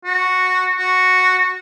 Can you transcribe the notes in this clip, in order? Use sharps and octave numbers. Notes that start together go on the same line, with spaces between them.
F#4
F#4